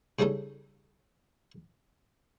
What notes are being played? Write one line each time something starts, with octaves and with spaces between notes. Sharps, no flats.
C#3 G3 C#4 D#4 A4